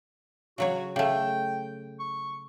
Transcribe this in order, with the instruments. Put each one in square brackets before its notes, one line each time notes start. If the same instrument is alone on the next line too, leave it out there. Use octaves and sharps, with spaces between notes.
[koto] C#3 F#3 C#5 [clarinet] F#4
[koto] C#3 A3 [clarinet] G5
[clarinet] C#6